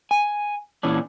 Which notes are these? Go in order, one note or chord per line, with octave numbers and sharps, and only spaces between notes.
G#5
A#2 E3 C#4 D4